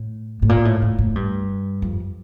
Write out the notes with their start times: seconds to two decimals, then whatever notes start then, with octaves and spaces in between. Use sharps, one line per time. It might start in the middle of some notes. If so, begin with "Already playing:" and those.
Already playing: A2
0.42 A2
0.49 A#2
0.65 A2
0.82 A2
0.99 A2
1.15 G2
1.82 F2